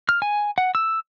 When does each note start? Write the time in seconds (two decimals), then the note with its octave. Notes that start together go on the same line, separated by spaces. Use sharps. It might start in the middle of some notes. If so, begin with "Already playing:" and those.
0.09 F6
0.22 G#5
0.58 F#5
0.75 E6